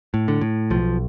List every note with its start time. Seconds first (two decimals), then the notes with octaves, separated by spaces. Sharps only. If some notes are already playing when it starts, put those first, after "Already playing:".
0.14 A2
0.28 D3
0.41 A2
0.70 B1 F3